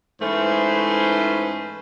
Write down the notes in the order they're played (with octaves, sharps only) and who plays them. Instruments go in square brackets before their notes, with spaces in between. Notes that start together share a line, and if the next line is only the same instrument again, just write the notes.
[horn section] G#2 E3 A3 C#4 B4 C5